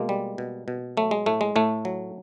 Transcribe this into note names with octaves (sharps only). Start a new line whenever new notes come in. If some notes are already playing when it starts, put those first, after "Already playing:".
Already playing: B2 G#3 A#3
G3
B2
B2
F#3 A3
G#3
A2 A3
G#3
A2 A3
F#3